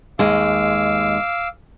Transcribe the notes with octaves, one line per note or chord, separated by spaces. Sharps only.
D#2 G#3 F5 D6 E6